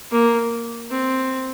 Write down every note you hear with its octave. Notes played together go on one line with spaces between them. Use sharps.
A#3
C4